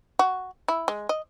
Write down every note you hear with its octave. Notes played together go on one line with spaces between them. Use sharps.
F#4
E4
G#3
D#5